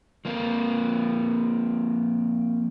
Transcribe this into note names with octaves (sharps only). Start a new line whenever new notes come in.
F3 A#3 C4 F4